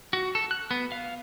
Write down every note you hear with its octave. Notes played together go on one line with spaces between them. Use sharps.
F#4
A4
F#6
B3
F5